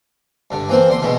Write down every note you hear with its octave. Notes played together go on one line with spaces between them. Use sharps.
G2 D3
E3 A#3 C4 C5
D3 C6
B2 G#3 A3